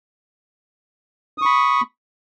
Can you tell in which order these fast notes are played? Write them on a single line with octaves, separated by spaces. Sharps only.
D#6 C#6 B5